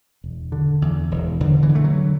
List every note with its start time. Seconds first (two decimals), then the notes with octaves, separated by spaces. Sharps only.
0.24 E1
0.52 D3
0.82 E2
1.11 E1
1.40 E1 D3
1.63 E3
1.69 D3
1.75 A3
1.84 F#3